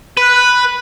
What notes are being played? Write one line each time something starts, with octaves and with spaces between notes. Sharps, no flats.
B4 F#6